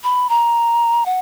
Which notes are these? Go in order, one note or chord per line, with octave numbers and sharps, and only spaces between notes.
B5
A#5
F#5